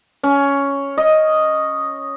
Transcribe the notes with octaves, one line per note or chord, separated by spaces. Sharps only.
C#4
D#5